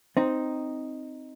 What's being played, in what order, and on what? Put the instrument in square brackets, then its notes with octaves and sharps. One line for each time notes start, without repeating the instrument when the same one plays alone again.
[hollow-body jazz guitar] C4 D#4